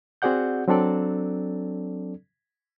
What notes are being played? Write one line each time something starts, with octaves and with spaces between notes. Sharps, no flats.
C4 F#4 G#4 D5 F#5 G6
F#3 C4 D4 A4 D5